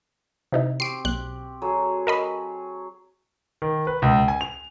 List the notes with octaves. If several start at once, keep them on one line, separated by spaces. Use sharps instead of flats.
C3 D#4 E4
C4 G4 C#6 C7 D7
B1 F#6
F#3 G#4 A4
A#4 D#5 B5
D#3
B4
C#2
G#5
F7